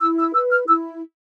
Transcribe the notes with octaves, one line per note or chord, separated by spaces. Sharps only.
E4 E6
E6
B4 E6
F6
E4 E6